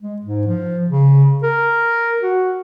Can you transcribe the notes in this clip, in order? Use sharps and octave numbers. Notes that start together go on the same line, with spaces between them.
G#3
G#2
F3
C#3
A#4
F#4